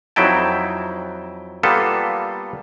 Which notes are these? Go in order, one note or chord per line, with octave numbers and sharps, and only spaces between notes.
F2 F#3 D#4 E4 G5 A5
G3 A#3 B3 F4 A4